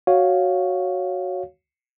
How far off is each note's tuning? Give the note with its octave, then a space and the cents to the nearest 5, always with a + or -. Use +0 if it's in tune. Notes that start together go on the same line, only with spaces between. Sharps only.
F#4 +0 C#5 +0 F5 +0